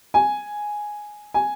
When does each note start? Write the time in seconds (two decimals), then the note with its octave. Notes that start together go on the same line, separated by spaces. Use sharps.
0.14 G#5
1.34 G#5